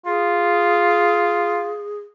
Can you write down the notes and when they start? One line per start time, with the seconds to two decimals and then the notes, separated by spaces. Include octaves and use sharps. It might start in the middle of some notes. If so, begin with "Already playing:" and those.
0.06 F4 G#4